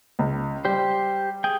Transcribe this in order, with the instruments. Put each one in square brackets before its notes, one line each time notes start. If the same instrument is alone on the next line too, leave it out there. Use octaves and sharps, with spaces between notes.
[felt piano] C#2
[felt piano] G3 [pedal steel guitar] G4 C5
[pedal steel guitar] G#4 G5